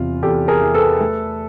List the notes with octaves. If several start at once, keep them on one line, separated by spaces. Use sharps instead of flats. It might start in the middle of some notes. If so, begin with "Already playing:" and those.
Already playing: E2 C3 F4
E2 G4 A4
G#4 A#4
E3
A4 B4
A3